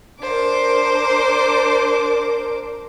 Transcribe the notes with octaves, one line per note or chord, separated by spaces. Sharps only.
D4 A#4 C5 D6